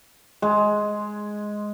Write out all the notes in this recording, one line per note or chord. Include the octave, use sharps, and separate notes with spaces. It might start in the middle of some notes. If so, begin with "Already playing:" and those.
G#3